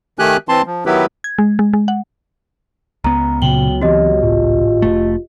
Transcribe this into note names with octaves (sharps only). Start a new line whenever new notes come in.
D#3 A3 G4 G#5 F#6
E3 C4 A5 C6
F3
D#3 F#3 B3 E4 G4 B4
G#6
G#3
G#3
G#3
F#5
C#2 B3 A#5
A#2 C#3 F#3 G5 F#7 G7
E3 C4 F#4 G4 D#5
G#1 A2 F4
F1 A3